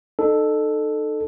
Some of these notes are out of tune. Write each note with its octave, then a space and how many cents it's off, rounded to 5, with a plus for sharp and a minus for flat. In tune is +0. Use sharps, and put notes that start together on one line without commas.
D#4 -35 A4 +0